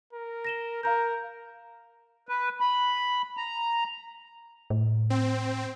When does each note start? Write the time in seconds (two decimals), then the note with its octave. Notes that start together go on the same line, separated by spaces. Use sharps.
0.13 A#4
0.45 A#6 E7 G7
0.83 A#4 F5 A#5 G6
2.29 B4
2.60 B5
3.37 A#5
4.70 A2
5.10 C4